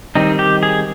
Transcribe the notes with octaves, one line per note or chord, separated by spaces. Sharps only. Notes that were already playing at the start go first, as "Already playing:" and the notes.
D#3 G3 C4 D#4
G4
G#4